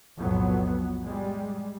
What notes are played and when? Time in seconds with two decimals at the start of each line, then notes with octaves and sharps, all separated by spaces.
0.18 B1 F2 A2 F3 F#3 B3
1.04 G3 G#3